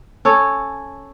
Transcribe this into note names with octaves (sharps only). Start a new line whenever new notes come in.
C#4 A4 C#5